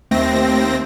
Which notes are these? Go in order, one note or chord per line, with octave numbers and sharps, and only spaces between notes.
D#2 A3 C4 A#6